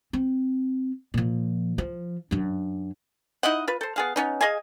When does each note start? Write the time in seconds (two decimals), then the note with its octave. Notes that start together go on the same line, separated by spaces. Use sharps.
0.13 C4
1.14 A#2 F3
1.78 F3
2.31 F#2 D4
3.43 D#4 E4 D#5 F#5
3.68 F4 B4
3.81 A4 C5
3.96 B3 G#4 F5
4.16 B3 C#4 D#4
4.41 G#4 D#5 F5 G#5